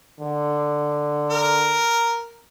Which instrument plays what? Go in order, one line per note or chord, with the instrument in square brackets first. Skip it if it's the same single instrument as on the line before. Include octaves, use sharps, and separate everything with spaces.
[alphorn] D3
[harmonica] A#4